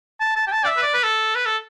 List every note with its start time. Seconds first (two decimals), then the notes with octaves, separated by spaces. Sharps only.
0.20 A5
0.36 A5
0.47 G5
0.52 A5
0.64 D5
0.67 E5
0.77 B4
0.83 D5
0.94 B4
1.03 A4
1.35 B4
1.46 A4